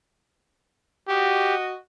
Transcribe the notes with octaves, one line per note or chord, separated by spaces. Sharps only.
F#4 G4 D#5